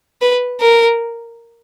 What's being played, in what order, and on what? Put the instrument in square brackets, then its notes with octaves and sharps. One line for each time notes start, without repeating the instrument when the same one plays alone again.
[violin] B4
A#4